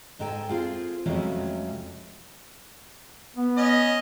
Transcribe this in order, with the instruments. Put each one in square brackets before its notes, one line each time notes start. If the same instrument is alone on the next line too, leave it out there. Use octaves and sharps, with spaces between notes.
[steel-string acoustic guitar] G#2 D#4 A4 G5 G#5
C4 F4 G#4
F2 C3 F#3 G#3 A3 C#4
[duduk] B3
[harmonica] C#4 D#5